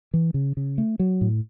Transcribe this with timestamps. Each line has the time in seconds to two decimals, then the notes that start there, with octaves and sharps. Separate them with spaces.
0.14 E3
0.34 C#3
0.57 C#3
0.78 A3
0.99 F#3
1.21 A2